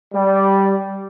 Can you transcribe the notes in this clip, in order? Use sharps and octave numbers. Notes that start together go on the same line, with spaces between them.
G3